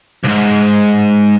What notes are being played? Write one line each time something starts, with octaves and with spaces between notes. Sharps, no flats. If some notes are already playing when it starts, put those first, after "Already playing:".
C2 G#2